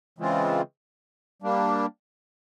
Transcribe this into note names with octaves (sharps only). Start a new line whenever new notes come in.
C#3 E3 G#3 C4 F4
G3 A#3 D4